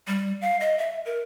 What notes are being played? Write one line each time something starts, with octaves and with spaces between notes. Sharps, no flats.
G3
F5
D#5
E5
A#4